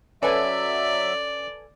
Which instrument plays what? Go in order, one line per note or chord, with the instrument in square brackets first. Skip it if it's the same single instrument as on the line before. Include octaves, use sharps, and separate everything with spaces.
[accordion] F#3 E5 [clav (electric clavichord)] C#4 [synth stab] A4 B4 G#5 [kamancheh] D5